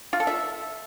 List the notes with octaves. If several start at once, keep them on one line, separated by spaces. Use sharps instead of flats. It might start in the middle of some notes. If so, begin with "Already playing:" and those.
F4
A4
E5